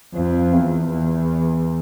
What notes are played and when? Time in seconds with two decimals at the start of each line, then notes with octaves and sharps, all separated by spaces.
0.14 F2
0.52 E2
0.90 E2